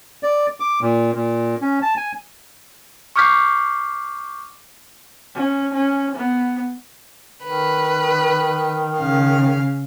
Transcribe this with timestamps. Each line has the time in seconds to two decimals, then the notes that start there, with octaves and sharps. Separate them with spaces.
0.23 D5
0.60 D6
0.82 A#2
1.15 A#2
1.62 C#4
1.82 A5
1.97 G#5
3.16 C#6 D6 F6 G6 B6 C7
5.34 C#4
5.73 C#4
6.15 B3
7.43 D#3 B4
8.97 C#3 F5